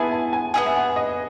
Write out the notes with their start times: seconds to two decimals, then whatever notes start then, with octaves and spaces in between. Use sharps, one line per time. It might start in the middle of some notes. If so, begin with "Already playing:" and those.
Already playing: B3 E4 G#4 G#5 A5
0.11 A5
0.33 G#5
0.54 B3 E4 G#4 G#5
0.66 E5
0.75 F#5
0.96 D#5